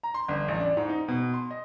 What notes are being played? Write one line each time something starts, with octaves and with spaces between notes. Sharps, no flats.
A#5
C6
G1
A1
D4
G#2
D#4
B2
C6
D#5